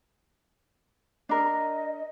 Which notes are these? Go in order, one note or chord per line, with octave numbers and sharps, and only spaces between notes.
D4 A#4 D#5